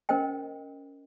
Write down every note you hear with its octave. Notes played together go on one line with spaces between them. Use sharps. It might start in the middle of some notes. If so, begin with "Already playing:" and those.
C#4 A#4 C5 D#5 G5